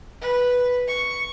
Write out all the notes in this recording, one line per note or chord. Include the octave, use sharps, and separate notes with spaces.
B4
C#6